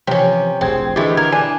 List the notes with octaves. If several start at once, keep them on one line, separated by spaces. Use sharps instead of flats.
C3 E3 F3 C#4 G5
F1 A#1 F2 C4 G#4 G#6
D3 E3 G#3 A3 E4 G4
A#4 G#6
D4 G#5